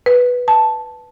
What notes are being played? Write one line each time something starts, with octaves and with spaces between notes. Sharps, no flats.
B4
A5